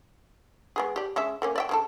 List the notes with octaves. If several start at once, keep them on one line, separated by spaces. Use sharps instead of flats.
G#3 B3 G#4
G4 D5
G#3 C#4 E5
A3 A#3 C#4
D5 E5 G5
C#3 C4 A4